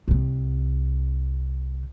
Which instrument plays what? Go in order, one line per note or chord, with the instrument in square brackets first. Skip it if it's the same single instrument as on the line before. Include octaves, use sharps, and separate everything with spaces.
[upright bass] C2 C3